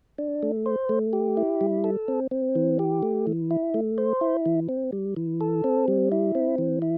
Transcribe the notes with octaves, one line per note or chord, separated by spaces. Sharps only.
D4
A3
C5
A3
G4
E4
G3
A4
C4
C4
E3
G4
A3
E3
E4
A3
C5
E4
E3
C4
G3
E3
A4
C4
G3
E4
C4
E3
E4